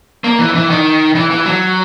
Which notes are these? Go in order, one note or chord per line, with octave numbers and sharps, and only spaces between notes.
A#3
E3
E3
D#3
E3
E3
F#3